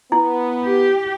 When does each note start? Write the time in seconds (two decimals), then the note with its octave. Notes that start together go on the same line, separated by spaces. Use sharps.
0.12 B3 E4
0.65 G4